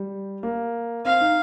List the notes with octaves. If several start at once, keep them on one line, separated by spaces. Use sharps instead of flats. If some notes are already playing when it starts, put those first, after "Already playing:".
Already playing: G3
A#3
C4 F5
D#4